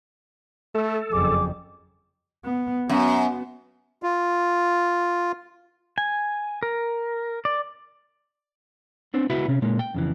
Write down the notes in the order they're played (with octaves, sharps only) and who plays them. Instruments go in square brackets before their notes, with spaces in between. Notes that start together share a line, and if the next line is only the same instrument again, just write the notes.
[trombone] A3 [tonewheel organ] A4
[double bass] F#1 F2 [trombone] G#4 [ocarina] D6
[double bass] B3
[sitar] F#2 [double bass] B3
[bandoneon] F4
[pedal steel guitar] G#5
A#4
D5
[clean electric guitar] B3 C4 D4 C5
C#2 B3 E4 F#4 E5 B5
C3 C#4
A#2 G#3 A#3
G5
F2 C#3 E3